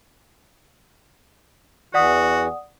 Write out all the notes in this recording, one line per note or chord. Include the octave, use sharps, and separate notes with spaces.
E2 E3 F#4 D5 F#5 D#6